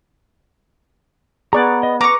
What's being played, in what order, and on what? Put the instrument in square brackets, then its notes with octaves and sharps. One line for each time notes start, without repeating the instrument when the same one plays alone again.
[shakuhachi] B3 [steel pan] G#4 D5 [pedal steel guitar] A#5 C#6 F#6
[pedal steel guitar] D#5
[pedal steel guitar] B4 [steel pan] A#5 [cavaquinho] C#6 D6